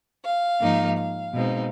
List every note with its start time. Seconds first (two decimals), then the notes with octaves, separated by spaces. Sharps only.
0.24 F5
0.60 G#2 F3 A#3 D#4
0.97 F5
1.33 B2 G#3 C4 D#4